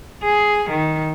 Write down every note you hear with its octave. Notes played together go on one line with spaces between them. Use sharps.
G#4
D#3